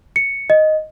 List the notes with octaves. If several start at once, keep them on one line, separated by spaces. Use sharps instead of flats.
C#7
D#5